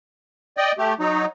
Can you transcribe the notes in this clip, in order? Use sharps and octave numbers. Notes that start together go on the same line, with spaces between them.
D5 D#5 G5
A3 G4
F#3 D#4